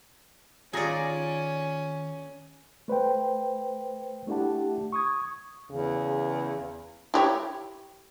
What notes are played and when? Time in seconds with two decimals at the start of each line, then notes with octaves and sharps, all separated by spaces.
0.73 D#2 C#4 F4 G#4 D5 A#5
2.88 A3 B4 C5 G5
4.27 A3 D4 E4 G4 F#5 A5
4.92 C#6 D#6 G#6
5.70 E2 C#3
7.14 E4 G4 C#5